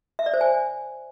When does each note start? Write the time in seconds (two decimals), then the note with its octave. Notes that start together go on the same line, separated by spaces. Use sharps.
0.19 E5
0.26 D5
0.34 C5
0.41 G#5